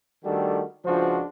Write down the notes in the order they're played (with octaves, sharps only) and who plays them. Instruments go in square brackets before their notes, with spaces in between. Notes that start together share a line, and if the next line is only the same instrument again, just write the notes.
[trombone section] D#3 G3 A3 D4 F#4 A4
C#2 F3 D4 F#4 C5